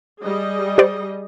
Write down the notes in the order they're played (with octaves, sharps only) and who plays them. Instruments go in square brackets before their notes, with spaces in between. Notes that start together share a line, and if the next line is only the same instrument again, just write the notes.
[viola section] G3 G#4 D#5
[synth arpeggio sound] G4 C5 D5